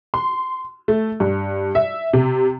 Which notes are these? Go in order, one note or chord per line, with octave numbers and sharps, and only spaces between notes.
C6
A3
G2
E5
C3